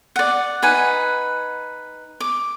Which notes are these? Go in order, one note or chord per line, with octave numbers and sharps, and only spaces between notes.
D5 F#5
D#4 B4 F#5 G#5
D6